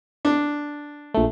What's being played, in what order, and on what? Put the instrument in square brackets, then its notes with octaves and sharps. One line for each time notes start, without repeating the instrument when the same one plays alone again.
[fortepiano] D4
[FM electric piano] A#1 A3